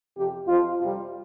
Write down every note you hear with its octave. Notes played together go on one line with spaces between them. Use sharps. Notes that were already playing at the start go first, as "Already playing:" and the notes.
F2 C3 F3 G4
F2 F3 F4
F2 C3 G3 F4